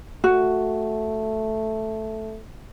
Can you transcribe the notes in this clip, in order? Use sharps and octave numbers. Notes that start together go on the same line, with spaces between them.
A3 F#4